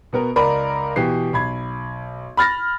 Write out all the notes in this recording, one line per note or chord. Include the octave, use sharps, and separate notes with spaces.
B2 B3 A#4
C#2 A#4 D5 A#5 B5
B2 E3 G4 C7
B1 B5 G#6
B5 F6 A6 A#6